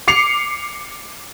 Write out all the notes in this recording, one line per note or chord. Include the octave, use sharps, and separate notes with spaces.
D6 C7 C#7 F7